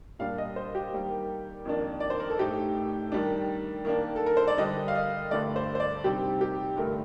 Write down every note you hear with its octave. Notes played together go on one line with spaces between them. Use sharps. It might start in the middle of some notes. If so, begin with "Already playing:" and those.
A#2 G3 D4 F5
D#5
C5
G4
D#3 G3 A#3
F2 D#3 A#3 D4
D5
C5
A#4
A4
A2 A3 D#4 G4
D#3 G3 D4
D#3 A#3 D4
A4
A#4
C5
D5
D3 G3 D4 D#5
F5
D#5
G2 D3 A3 D5
C5
C5
D5
C3 G3 C4 D#4 G4
G4
G2 D3 A3 D#4 A#4